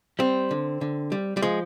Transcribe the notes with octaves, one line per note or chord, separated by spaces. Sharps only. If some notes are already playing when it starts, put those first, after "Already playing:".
G3 C4
D3
D3
G3
G3
F3 G#3